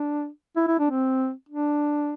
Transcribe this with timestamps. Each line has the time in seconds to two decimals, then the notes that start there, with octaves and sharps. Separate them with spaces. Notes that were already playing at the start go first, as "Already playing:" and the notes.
Already playing: D4
0.56 E4
0.67 E4
0.79 D4
0.91 C4
1.49 D4